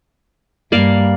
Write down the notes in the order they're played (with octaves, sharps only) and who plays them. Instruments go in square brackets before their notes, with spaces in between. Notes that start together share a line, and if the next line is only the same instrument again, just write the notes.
[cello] G2 G3 [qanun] A#3 D5 F5